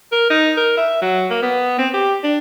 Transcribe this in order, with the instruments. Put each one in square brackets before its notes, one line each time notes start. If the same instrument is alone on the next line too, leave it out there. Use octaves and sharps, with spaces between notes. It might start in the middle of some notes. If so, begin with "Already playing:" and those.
[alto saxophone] A#4
D#4
A#4
E5
F#3
A#3
B3
C4
G4
D4